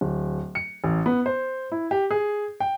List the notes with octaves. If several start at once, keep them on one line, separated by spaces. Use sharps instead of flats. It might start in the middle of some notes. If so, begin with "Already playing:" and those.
D1
C#7
A1
B3
C5
E4
G4
G#4
G5